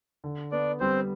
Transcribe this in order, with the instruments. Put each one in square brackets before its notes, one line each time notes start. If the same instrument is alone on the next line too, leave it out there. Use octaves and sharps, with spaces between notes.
[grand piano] D3
[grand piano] B3 [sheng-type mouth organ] D4 D5
[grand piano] G3 [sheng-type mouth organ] C4 C5